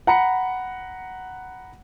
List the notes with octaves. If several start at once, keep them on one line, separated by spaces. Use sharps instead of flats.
F#5 A#5 B5 C#7